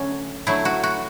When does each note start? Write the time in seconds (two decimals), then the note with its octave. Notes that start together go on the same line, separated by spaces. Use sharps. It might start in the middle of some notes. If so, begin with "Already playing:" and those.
Already playing: D3 F#3 A3 C#4
0.47 D3 F#3 A3 E4
0.65 F#4
0.83 F#4